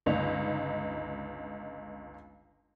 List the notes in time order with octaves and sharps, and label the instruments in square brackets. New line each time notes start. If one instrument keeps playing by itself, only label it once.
[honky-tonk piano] G1 C#2 D#4 F7